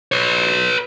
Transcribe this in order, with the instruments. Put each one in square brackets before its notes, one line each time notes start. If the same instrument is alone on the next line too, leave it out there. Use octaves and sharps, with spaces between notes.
[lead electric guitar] B4 C#5